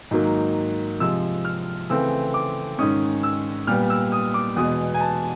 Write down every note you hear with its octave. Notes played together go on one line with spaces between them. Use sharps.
G#2 D#3 F#3 A#3
C3 F3 G#3 E6
F6
C#3 E3 A3 C4 E6
D6
G#2 D#3 G#3 C#4 D#6
E6
A#2 G3 B3 F6
E6
D#6
D6
E2 B2 G#3 D#6
G#5
A5